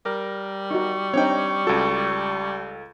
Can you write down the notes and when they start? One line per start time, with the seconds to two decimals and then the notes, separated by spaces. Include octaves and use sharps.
0.06 G3 A#4
0.71 D#4 F#4 C#6
1.14 C4 D4 D#4 C#5 G5
1.67 C#2 F#4 A4